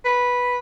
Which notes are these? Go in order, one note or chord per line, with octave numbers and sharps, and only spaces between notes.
B4